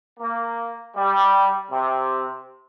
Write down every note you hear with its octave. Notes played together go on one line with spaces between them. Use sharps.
A#3
G3
C3